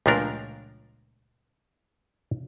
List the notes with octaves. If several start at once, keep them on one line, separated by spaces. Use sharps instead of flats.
C#2 A#2 F3 A3 D4 A#4